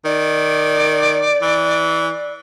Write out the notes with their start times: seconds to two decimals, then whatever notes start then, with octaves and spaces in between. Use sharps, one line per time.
0.05 D#3 D5
1.42 E3